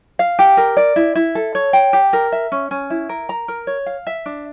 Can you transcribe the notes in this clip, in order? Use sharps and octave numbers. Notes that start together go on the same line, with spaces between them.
F5
G4
A#4
D5
E4
E4
A4
C#5
G5
G4
A#4
E5
C#4
C#4
E4
A#4
A#5
A#4
C#5
F5
E5
D4